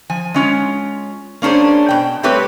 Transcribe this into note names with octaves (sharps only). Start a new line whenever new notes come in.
F3 G#5
G#3 C#4 F4
A#3 C#4 D4 G#4 C5
B2 G5
G3 A3 C4 G4 B4 C#5